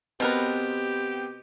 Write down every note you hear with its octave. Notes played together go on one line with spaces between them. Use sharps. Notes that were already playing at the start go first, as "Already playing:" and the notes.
B2 B3 C4 G4 A#4 B4